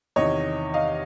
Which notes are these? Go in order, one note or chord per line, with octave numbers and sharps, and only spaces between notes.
E2 C3 D#3 C#5 D#5
D#5 F5